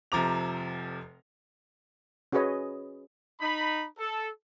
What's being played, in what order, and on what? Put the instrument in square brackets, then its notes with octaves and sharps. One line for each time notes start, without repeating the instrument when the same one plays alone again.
[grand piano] F1 C3 F3 A#5 D6 F7
[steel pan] C#4 F#4 G#4 B4 C#5 D#5
[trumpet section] D#4 B5
A4